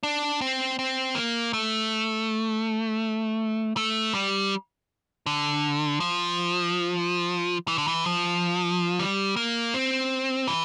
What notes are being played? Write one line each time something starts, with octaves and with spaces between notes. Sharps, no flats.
D4
C4
C4
A#3
A3
A3
G3
D3
F3
E3
D3
E3
F3
G3
A#3
C4
E3